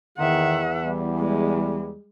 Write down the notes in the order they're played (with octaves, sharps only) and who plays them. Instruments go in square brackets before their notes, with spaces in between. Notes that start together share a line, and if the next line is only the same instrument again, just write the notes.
[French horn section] E2 [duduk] D#3 [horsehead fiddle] E5 F#5
[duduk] G3
[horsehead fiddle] G#3